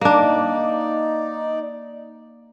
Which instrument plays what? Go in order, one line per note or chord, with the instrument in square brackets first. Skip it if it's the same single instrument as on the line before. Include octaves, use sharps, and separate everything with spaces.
[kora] A#3 D4 [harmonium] D#4 D5